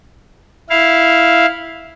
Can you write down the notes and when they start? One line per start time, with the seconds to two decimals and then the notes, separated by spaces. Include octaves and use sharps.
0.70 E4 F5